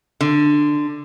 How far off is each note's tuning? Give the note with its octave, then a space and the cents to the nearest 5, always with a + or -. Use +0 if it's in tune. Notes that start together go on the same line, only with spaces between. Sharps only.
D3 +10